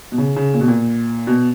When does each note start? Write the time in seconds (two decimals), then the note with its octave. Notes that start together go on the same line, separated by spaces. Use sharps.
0.12 B2
0.18 C#3
0.36 C#3
0.54 A#2
0.61 B2
0.68 A#2
1.27 B2